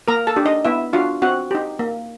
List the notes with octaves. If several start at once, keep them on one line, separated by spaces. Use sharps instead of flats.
A#3 A#4 A#5
A4 A5
D4 G4
D#4 D#5
B3 E4 E5
D4 F4 F#4 F5
C4 F#4 F#5
D#4 G4
A#3